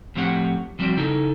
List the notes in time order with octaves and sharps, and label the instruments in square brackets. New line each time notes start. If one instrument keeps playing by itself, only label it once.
[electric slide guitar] A2 F3 C4 G4 C#5 F#5
F3 G3 C4 F#4 D5
C#3 D#4 E4 A4